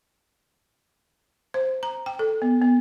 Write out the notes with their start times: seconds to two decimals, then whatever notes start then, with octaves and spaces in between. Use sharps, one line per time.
1.54 C5
1.83 A#5
2.06 G5
2.19 A4
2.42 B3
2.62 B3